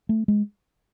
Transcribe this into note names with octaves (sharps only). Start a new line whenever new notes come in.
A3
G#3